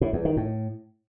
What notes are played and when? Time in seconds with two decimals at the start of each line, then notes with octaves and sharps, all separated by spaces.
0.01 A2
0.13 E2
0.25 D#3
0.37 A2